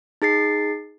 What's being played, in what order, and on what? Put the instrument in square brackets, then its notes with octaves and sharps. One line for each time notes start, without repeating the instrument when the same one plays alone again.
[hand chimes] D#4 G#4 A6 C7